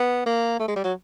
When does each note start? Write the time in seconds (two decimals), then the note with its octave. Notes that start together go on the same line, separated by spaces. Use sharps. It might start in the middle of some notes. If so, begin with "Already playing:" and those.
Already playing: B3
0.26 A#3
0.60 A3
0.68 G#3
0.76 G3
0.84 F#3